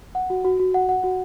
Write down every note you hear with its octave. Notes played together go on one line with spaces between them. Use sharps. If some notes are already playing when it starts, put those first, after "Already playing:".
F#5
F#4
F#4
F#4
F#5
F#5
F#4